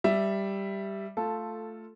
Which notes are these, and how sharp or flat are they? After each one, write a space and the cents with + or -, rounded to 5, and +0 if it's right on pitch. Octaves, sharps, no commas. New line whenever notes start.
G3 +0 E5 +5
A3 +10 F4 +0 A4 +0